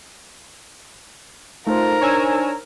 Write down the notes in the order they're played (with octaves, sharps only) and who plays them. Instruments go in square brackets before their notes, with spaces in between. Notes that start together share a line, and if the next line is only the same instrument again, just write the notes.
[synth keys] A3 [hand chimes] D#4 C5 [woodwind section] F4 [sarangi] A#4
[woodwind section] D4 [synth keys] C#5 G#5 E6